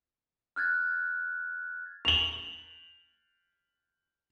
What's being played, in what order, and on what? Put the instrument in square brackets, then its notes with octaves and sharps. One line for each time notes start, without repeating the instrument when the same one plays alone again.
[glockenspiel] F6 F#6 G#6 A6
[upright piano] F7 F#7